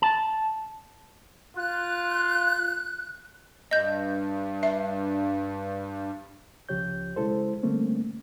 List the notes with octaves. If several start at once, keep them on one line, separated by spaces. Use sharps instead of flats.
A5
F4 F#6
G2 D#5 G6
E5
C#2 C#3 F3 G4 C#5 G6
C#3 G#3 E4 A4 C5
D3 G3 A3 A#3 C4 C#4